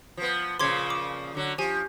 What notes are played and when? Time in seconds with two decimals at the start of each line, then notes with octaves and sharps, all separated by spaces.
0.17 F3 B3
0.60 A#2 C#3 F3 C6 D6 G#6
0.90 D6
1.35 D3 F#3
1.58 F3 G4 G#5